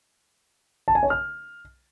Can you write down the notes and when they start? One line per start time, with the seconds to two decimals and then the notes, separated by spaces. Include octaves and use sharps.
0.88 A5
0.95 G#5
1.03 C#5
1.10 F6